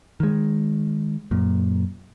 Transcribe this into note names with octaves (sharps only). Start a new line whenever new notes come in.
D#3 G#3
F#2 A#2